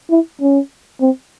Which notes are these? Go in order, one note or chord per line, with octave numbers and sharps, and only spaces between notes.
E4
C#4
C4